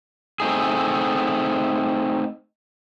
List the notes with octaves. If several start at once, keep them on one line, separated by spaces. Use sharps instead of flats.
A3 C4 D#4 G#4